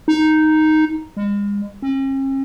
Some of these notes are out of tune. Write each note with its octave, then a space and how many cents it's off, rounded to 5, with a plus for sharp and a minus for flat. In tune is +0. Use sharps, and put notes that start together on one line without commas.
D#4 +0
G#3 -40
C#4 -45